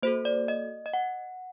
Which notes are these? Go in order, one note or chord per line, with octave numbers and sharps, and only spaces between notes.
A#3 F#4 A4 C5
D5
D#5
D#5
F#5